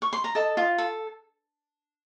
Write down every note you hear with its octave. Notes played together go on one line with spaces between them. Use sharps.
C#6
C6
A#5
A4 D#5 A5
F4
A4